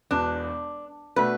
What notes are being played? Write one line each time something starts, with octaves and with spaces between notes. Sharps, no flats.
E1 E2 B2 D4
B2 A3 D4 F#4 B4